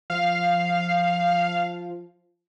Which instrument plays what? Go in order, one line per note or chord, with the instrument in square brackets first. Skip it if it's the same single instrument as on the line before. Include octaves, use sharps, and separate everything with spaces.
[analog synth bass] F3 [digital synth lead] F5